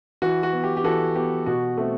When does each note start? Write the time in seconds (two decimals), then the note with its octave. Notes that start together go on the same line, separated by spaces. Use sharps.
0.22 E3 F#4
0.43 F#4
0.53 B3
0.64 G4
0.77 G4
0.84 E3 F#4 A4
1.15 B3 G4
1.46 B2 F#4
1.77 A3 C4